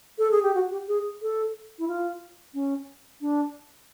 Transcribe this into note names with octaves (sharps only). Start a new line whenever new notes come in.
A4
G#4
G4
F#4
G4
G#4
A4
E4
F4
C#4
D4